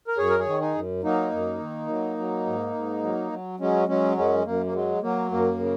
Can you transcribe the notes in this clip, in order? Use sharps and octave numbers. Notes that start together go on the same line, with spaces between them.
A#4
F#2 G#4 C#5
A#4
G#4 C#5
D#3
D#4 G#4
F#2
F#3 A#3 D#4
F#2
D#3
F#3
F#3
G#2
G#2
F#3
F#3
F#3 G#3 C#4
F#3 G#3 C#4
F#2 G#3 C#4
F#2 A#3
A#3
F#3 G#3
F#3 A#3
F#2 A#3
C#3